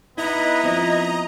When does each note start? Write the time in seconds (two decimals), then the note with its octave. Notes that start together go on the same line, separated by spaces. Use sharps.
0.18 B3 D#4 E4 D#5 A#5
0.63 F3 B3 C4 D#4